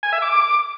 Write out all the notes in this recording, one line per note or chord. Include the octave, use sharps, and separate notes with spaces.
G#5
E5
D6